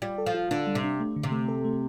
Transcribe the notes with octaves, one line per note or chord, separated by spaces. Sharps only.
G3 F4
A4
F3
F4
D3 D4
G3
C3
D4
A3
D3
C3
A3
A4
A3